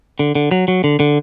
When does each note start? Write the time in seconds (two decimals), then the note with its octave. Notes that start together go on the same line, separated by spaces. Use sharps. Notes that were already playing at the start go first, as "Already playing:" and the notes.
0.19 D3
0.35 D3
0.51 F#3
0.68 F#3
0.84 D3
1.00 D3